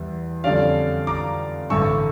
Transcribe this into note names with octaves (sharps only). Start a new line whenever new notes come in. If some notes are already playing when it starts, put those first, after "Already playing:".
Already playing: E2 G3
F2 D3 G3 C#4 D5 F5
A#5 D6
A1 G2 D3 C#6 E6